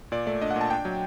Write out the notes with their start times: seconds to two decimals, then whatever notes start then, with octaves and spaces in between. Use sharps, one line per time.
0.12 A#2 D5
0.27 A3 D5
0.42 D4 D#5
0.51 F#5
0.56 A#2 A5
0.70 D4 G5
0.85 F#3